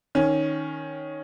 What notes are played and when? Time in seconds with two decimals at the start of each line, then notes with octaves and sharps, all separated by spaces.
0.15 D#3 C#4